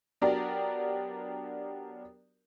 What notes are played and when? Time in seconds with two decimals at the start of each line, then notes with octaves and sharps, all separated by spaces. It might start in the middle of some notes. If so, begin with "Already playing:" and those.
0.21 F#3 B3 D4 G4 A#4 D5